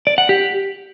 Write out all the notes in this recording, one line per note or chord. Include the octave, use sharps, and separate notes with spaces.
D5
F#5
G4